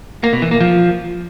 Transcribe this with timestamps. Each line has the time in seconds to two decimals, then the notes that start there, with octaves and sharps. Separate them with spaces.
0.24 A#3
0.33 B2
0.42 E3
0.51 A#3
0.60 F3